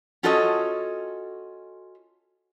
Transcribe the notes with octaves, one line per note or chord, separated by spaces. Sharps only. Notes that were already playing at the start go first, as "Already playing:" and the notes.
C#4 F4 F#4 A4 C#5 D#5